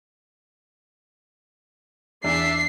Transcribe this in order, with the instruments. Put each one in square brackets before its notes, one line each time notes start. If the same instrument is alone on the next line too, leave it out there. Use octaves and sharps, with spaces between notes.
[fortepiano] E2 [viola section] D4 E5 [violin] C7